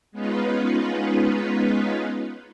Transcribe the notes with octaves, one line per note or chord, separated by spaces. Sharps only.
G#3 B3 C#4 D#4 F4 B4